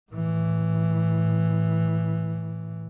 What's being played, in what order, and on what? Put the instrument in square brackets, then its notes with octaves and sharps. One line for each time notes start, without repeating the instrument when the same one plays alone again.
[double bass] A2 E3